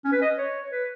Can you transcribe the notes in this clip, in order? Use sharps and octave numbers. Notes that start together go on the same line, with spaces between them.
C#4
B4
D#5
C#5
B4